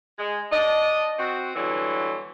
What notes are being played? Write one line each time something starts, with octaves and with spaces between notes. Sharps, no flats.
G#3
D4 D#5
C4 F#4
G2 B2 D3 E3 F#3